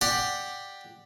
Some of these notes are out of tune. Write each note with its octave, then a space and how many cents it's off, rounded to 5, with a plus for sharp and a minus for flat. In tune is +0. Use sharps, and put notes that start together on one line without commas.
G4 +5 D5 +10 F#5 +0